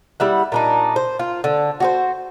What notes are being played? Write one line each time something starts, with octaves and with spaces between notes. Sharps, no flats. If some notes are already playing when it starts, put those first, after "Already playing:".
G3 E4 F#5
A#2 D4 D#4
C5
F4
D3
F#4 G4 C5